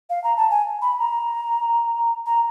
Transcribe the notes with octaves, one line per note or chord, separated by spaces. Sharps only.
F5
A#5
A5
G#5
B5
A#5
A#5